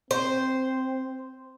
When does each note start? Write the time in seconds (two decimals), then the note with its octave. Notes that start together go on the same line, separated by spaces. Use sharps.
0.11 C4 C5